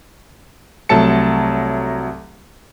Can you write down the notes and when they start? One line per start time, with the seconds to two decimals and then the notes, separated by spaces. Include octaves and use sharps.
0.89 C2 F#3 A3 A4 A5 C#7